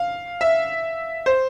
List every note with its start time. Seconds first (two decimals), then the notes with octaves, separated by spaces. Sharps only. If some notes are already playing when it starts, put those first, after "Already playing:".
Already playing: F5
0.41 E5
1.26 C5